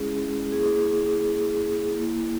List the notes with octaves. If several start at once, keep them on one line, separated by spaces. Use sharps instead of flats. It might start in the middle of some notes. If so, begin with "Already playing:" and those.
Already playing: G#3 C#4 E4 G#4
A#3 E4 G#4
A#3 E4